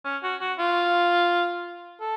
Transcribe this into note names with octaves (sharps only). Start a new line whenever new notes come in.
C#4
F#4
F#4
F4
A4